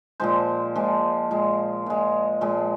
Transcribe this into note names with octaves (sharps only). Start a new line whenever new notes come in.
A#2 F3 G#3 C5
A#2 F3 G#3
A#2 G#3
A#2 G#3
A#2 F3 G#3